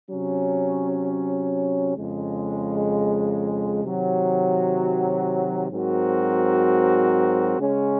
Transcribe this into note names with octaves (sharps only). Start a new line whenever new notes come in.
C3 F#3 C#4
F2 C#3 G#3
C3 D#3 F#3
G#2 F#3 C4 F#4 A#4
C#3 G#3 C#4